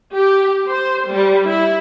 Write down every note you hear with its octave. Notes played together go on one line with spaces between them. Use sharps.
G4
C5
G3
E4